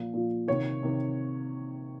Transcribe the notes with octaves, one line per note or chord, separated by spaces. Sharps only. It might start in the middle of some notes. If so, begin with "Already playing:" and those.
Already playing: A#2 F3
A#2 F3
C3 D#3 C#5
C3 D#3